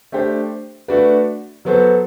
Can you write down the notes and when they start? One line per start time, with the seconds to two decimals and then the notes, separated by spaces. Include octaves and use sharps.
0.12 A3 D4 G4 C5
0.88 A3 D4 F#4 B4 D5
1.65 F#3 B3 F#4 A4 C5